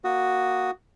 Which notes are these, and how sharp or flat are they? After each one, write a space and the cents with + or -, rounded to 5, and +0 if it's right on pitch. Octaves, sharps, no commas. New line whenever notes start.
A#3 +0 F#4 +0 D#6 +0